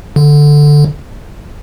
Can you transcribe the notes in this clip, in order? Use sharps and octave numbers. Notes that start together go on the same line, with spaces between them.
D3